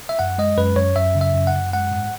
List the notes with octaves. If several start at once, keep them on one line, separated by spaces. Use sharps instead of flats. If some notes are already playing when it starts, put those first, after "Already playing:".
E5
F#2 F#5
G#3 D#5
F#2 B4
F#2 C#5
F#2 E5
C#3
E5
F#2
F#5
F#2
G#3 F#5
G#2